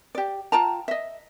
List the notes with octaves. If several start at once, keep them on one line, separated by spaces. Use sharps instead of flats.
G4 D5
F4 G5 A5 A#5
D#5 E5